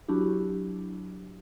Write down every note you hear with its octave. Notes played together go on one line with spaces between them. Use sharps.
F#3 D4 E4 F#4 G4